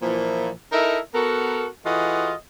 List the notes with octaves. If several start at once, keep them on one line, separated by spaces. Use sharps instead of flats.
A#2 E3 F3
D#4 E4 A4 A#4 D#5 E5
B3 F#4 A4 A#4
E3 F4 F#4 G#4 A4 D#5